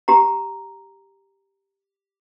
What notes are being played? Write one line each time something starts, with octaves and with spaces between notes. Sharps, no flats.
G4 A#5